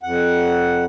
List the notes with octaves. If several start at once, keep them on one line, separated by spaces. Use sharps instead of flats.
F2 F#5